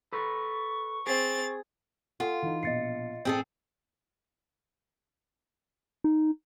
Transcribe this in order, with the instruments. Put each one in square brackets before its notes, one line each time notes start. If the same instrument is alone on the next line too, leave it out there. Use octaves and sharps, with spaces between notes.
[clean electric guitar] A4 B4 [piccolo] C#6
[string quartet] C4 A6 [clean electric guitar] G#4
[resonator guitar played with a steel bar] F4 [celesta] A4 F#5 [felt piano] G#5
[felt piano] E3 D#4
[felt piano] A#1 B2 C#7 [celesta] D#5 A6 C7
[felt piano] A1 [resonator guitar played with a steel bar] C4 G#4 A4
[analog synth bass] D#4